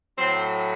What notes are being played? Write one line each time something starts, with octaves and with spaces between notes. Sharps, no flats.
A2 F#3 C4